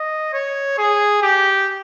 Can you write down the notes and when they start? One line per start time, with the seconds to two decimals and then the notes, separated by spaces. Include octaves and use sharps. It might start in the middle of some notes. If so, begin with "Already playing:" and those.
Already playing: D#5
0.33 C#5
0.78 G#4
1.22 G4